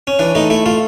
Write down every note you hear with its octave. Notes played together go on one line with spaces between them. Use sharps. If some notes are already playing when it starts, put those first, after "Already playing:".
C#4
E3 D4
A3 D#4
A3 E4
A3 F4